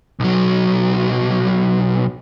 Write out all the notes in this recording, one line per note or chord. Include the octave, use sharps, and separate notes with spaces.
B1 F#3